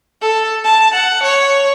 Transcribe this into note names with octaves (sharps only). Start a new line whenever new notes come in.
A4
A5
F#5
C#5